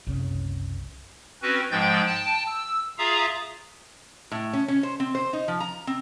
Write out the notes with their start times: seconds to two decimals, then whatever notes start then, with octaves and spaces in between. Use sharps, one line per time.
0.07 F#1 C2 C#3
1.42 C4 C#4 F#4 B4
1.71 G#2 F3 G#3 G5 G6 A6
2.07 G5 A5
2.46 E6
2.98 F4 G#4 E5 F5 A#5 D#6
4.32 A2
4.53 C#4
4.68 C#4
4.83 C5
5.00 C4
5.15 C5
5.33 D#4
5.48 F3
5.60 A#5
5.87 C4